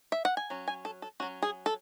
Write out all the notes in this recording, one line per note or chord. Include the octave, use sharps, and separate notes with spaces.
E5
F#5
G#5
F#3 C#4
G#5
A4
A4
F#3 C#4 F#4
G#4
A4